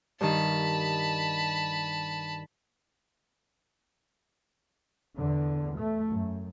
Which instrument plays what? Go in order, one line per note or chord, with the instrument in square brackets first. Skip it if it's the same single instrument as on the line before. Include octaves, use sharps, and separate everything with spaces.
[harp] G2 D#3 [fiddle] A5 B5
[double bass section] E2 D3
A3
F#2